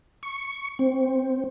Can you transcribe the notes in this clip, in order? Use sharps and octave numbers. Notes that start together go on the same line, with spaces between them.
C#6
C4